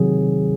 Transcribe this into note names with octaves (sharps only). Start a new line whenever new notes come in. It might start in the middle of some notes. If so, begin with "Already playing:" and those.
Already playing: C3 D#3 F#3 C4 G#4